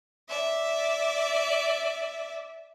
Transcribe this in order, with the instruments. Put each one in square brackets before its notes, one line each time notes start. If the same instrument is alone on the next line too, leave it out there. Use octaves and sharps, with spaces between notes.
[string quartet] D5 E5